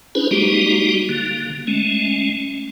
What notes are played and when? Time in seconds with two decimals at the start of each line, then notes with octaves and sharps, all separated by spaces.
0.15 C#4 D4 E4 G#4 B4 C5
0.31 G3 G#3 A#3 D#4 F#4 G4
1.09 D3 A#3
1.67 G#3 A3 C#4